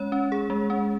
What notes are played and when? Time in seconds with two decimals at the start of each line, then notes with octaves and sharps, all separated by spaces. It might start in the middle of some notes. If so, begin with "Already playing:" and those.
Already playing: G#3 C#4 C#5
0.12 C#4
0.32 G#4
0.50 G#3
0.70 C#4